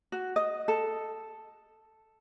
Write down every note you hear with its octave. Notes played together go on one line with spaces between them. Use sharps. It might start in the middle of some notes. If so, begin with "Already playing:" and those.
F#4
D#5
A4